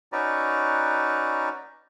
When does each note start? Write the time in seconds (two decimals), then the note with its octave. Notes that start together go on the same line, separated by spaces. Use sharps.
0.13 C#4 D#4 F#4 B4 D5 A#5